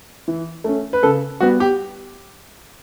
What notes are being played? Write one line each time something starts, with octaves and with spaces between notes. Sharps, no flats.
E3
A3 C#4
B4
C#3 A4
G3 B3 F#4
G4